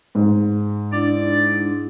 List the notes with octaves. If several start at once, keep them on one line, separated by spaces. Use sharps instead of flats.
G#2
D4 E4 D5